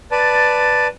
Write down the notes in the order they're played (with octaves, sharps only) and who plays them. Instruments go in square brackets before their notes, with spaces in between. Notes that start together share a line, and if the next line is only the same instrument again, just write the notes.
[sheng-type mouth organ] B4 D5 A5